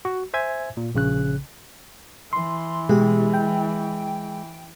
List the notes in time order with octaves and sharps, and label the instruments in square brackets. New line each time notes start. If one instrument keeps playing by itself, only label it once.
[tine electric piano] F#4
C5 E5 G#5 G#6
A#2
A#1 C#3 F#6
[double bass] E3 [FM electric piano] C6
[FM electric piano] B2 G4 [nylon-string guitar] G#3
[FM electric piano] G5